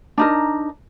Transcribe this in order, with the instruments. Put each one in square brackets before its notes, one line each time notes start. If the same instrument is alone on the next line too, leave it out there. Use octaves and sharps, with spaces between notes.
[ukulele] D4 D#4 A#4